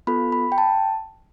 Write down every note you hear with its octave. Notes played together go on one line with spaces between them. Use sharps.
B3 F4 A4 B5
B5
G5
A5